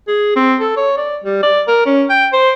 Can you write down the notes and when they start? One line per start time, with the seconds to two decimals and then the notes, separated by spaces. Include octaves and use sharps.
0.08 G#4
0.36 C4
0.60 A4
0.77 C#5
0.97 D5
1.24 G3
1.43 D5
1.68 A#4
1.86 C#4
2.10 G5
2.33 C5